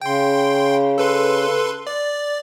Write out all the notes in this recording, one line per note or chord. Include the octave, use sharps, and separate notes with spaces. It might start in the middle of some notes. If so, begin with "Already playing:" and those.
C#3 G5 C6
A4 B4 C6
D5